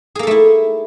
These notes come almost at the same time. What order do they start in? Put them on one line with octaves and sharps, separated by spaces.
G#4 A#3 A4 A3 E4